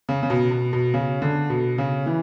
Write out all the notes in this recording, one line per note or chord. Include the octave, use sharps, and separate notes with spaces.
C#3
C#3
B2
B2
B2
C#3
D3
B2
C#3
E3